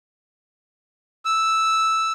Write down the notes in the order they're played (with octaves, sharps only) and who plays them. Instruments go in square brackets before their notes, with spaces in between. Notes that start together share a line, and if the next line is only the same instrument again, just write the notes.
[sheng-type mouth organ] E6